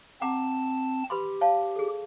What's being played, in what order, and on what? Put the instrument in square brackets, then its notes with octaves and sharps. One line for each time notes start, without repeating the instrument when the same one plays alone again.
[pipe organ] C4 A5 [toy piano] F#5 A#5 D6
[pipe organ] G4 [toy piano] B4 B5 C6
[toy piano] C#5 F5 A5
G#4 A4